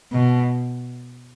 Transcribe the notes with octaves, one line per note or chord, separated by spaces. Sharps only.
B2